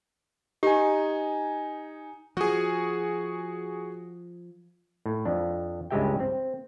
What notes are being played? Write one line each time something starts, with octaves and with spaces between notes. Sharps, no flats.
D#4 G4 G#5
F3 F#4 G#4
A2
F2 D4
C#2 G2 G#3 G4 E5 G5
C4